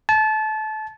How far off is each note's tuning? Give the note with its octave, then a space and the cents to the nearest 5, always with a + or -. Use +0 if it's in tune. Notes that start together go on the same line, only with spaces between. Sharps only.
A5 -25